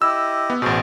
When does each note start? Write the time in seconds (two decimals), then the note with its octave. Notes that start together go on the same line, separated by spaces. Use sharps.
0.02 E4 G4 D#5 E6
0.50 B3
0.62 A1 B2 G#4 C5